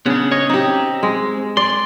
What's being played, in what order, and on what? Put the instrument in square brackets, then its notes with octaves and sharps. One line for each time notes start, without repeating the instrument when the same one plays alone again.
[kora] C#3 [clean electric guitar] B3 D4
[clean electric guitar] C#5 [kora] D#5
[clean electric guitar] C4 [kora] D#4 G4
[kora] G#3
[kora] D5 [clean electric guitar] C6